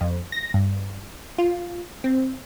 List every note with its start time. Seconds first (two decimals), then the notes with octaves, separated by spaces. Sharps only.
0.01 F2
0.32 A#6
0.54 G2
1.38 F4
2.04 C4